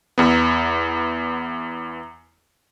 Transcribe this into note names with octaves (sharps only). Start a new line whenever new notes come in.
E2 B3